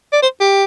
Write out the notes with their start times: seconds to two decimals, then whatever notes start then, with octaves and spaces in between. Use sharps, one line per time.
0.13 D5
0.23 C5
0.40 G4